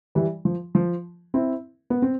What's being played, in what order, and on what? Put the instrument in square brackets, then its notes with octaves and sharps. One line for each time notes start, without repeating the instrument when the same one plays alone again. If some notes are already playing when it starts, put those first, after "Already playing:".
[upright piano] E3 G3
F3
F3
C4 E4
B3
C4